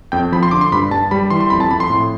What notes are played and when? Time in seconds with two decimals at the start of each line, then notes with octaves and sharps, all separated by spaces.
0.12 F2 G5
0.32 F3 B5
0.43 C6
0.51 D3 D6
0.61 C6
0.72 G2 B5
0.91 G2 A5
1.11 G3 B5
1.30 E3 C6
1.40 C6
1.50 F2 B5
1.60 A5
1.71 F2 B5
1.80 C6
1.90 A2